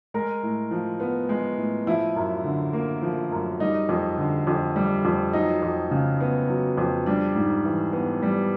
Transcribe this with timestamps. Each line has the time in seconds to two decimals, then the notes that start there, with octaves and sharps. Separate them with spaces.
0.14 G#3 A#4
0.43 A2
0.71 F3
1.00 B3
1.29 G#3
1.58 A2
1.86 F3 E4
2.16 F#2
2.44 D3
2.73 A#3
3.02 F3
3.32 F#2
3.60 G3 D#4
3.89 F2
4.17 D3
4.47 F2
4.76 G3
5.05 F2
5.33 F#3 D#4
5.62 F2
5.91 C#3
6.21 B3
6.48 F#3
6.78 F2
7.06 G3 D4
7.35 G#2
7.64 E3
7.93 B3
8.23 G3